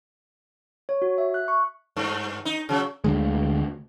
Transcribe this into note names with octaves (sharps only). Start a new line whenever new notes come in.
C#5
F#4
E5
F#6
C#6
G2
D#4
C#3 F#3
D2 D3 G#3